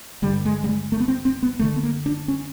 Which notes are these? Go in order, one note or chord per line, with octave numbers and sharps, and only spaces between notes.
G2 D3 G3
G#3
G3
G#3
A3
B3
C4
C4
B3
F#2 D3 A3
B3
A#3
D4
C#4